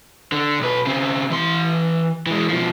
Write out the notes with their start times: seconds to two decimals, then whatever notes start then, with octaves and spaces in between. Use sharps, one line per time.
0.32 D3
0.59 B1 B4
0.87 C#3 C4
1.30 E3 C6
2.26 E3 G#3
2.49 B2 F3